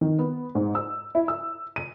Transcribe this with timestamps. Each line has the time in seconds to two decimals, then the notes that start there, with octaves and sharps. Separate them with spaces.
0.01 D#3
0.19 B3
0.55 G#2
0.75 E6
1.15 E4
1.28 E6
1.76 D#7